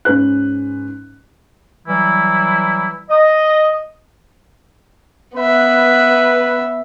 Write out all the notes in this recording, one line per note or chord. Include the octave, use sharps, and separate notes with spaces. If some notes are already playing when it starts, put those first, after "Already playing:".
G#2 C#4 B4 F#6
E3 F#3 G3 E4
D#5
B3 B4 E5